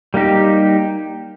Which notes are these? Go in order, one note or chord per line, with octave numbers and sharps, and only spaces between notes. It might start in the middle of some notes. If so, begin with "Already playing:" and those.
G3 A#3 D#4 G4